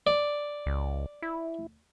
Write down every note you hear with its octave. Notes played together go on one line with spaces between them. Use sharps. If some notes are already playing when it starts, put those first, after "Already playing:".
D5
C#2
E4